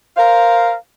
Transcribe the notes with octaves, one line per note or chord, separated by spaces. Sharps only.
A#4 C5 F5